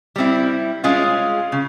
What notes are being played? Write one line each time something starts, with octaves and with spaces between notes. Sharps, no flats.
G3 C4 E4
G#3 C#4 F4 G#4
C#3